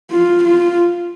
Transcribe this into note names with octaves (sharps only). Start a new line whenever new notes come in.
F4
F4